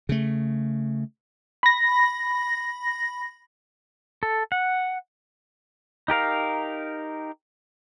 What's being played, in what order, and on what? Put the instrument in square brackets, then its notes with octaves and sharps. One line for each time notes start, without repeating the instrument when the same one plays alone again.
[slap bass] C#3 A3
[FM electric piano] B5 A#6
[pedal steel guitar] A4
F#5
D#4 G4 A#4 F5